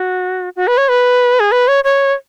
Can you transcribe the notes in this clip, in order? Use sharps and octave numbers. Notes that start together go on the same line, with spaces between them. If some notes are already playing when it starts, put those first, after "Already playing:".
Already playing: F#4
F#4
B4
C#5
B4
G#4
B4
C#5
C#5